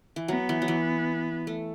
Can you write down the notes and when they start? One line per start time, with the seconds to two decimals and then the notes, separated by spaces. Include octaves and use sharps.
0.16 E3
0.28 F#3 B3
0.49 E3
0.62 F#3
0.68 E3
1.47 A3